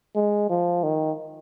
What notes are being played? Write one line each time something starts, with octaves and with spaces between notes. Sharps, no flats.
G#3
F3
D#3